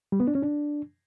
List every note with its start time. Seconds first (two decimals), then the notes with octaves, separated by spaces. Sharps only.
0.12 G3
0.20 B3
0.27 D4
0.35 C#4
0.43 D4